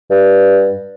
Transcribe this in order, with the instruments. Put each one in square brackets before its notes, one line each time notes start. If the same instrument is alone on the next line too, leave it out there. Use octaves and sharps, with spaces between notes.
[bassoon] G2